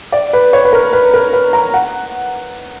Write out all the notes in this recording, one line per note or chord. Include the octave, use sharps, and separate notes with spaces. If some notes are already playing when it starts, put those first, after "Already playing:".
D5
B4
C#5
B4
A#4
B4
A#4
B4
A#5
F#5